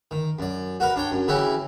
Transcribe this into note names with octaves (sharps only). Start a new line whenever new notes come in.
D#3
F#2 D5
F#4 A#4 B4
D4 C#5 G5
F#2
C#3 E3 E4 F#4 G4